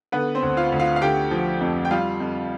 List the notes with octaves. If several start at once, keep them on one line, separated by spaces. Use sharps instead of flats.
D3 B3 B4
C4 C5
D2
F4 F5
D2
F4 F5
F5
D3 G4 G5
F3
F2
G5
G3 F4 F5
F2